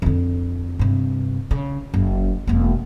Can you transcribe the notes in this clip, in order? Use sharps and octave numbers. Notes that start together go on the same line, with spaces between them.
F2 D3
G2 C3
C#3
F#1
E1 A#3